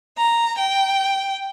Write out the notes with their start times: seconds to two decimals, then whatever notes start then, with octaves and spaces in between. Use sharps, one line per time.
0.17 A#5
0.56 G5